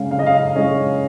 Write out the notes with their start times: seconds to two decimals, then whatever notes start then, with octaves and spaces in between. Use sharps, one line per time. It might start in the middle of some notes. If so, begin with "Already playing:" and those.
Already playing: C#3 G#3 C#4 F5
0.11 C#3 F5
0.19 D#5
0.26 F5
0.56 G#3 C#4 D#5